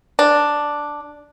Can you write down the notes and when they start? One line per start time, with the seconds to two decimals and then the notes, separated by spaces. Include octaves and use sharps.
0.19 D4